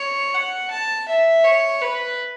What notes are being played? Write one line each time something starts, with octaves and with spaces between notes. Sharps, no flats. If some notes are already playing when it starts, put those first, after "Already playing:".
Already playing: C#5
F#5
A5
E5
C#5
B4